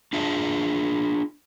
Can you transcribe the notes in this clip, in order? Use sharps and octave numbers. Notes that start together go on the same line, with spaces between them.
D4 F4 G#4 E5 A5